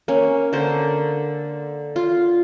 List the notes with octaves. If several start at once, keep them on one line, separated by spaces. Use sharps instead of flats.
A#3 C#4
D3 A#3 C5
F4